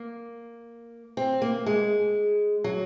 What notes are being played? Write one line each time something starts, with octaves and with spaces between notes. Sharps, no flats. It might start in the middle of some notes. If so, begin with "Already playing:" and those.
Already playing: A#3
C4
A#3
G#3
F#3